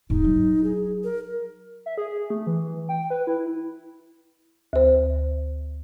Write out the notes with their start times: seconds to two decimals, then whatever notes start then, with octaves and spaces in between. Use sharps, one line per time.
0.10 D#1 G#2 D#4
0.24 F#3
0.64 G#4
1.04 A#4
1.86 E5
1.98 G#4
2.30 A3
2.47 E3
2.89 G5
3.10 B4
3.27 E4
4.73 D2 C5